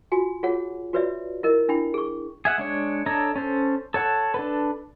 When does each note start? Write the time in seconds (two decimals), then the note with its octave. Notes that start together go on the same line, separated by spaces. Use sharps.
0.12 F4 F#4 G#5
0.43 F4 G#4 C#5 F#5
0.93 F4 F#4 B4 C#5 D5 E5
1.43 E4 A#4 D#5
1.69 D4 E4 G5 B5
1.94 G#4 C#6
2.45 G#4 E5 F#5
2.58 G#3 D4 C#5
3.06 D4 A4 C#5 D#5 A#5
3.36 C#4 A4 C5
3.94 A4 C#5 F#5 A5
4.34 D4 A4 B4